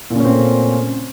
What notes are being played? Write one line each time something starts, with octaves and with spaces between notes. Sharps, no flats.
A#2 C#3 A3 C4 C#4